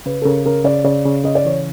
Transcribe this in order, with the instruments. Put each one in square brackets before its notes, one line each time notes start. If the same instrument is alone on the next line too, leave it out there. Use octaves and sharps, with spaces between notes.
[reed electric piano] C#3 [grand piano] B4
[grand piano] A4
[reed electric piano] C#3 [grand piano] A#4
[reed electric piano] C#3 [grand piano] A#4
[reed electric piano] C#3 [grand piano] D5
[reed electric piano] C#3 [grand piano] D5
[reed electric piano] C#3
[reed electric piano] C#3 [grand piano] D#5
[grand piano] D5
[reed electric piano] E3 [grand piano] C#5